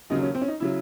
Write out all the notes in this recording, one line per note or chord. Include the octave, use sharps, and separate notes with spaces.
D#2 C#3 F#3 D#4
C#4
C4
C#4
D#4
C#3 F#3 E4